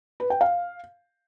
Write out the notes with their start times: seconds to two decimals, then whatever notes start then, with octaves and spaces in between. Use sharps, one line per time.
0.20 B4
0.30 G5
0.41 F5